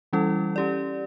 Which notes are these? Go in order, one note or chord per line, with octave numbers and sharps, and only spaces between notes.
E3 G3 C#4 E4 A4
C#4 G4 D5